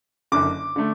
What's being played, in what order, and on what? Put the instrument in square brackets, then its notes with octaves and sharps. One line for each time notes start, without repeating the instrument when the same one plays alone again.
[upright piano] F#1 F#2 D3 D6
D3 A3